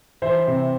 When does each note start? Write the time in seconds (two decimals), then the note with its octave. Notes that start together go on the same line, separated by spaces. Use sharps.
0.22 E3 C5 E5
0.47 C3